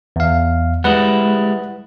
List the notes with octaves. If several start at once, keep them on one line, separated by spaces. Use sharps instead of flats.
E2 F5
G3 G#3 E4 B4 F#5